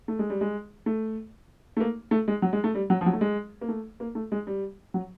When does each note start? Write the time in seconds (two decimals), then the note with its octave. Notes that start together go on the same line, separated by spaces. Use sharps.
0.08 A3
0.19 G#3
0.30 G3
0.41 G#3
0.86 A3
1.77 A3
1.80 A#3
2.11 A3
2.28 G#3
2.42 F#3
2.53 G#3
2.64 A3
2.75 G3
2.90 F#3
3.01 F3
3.06 F#3
3.13 A3
3.21 G#3
3.61 A#3
3.68 A3
4.00 A#3
4.15 A3
4.32 G#3
4.47 G3
4.94 F#3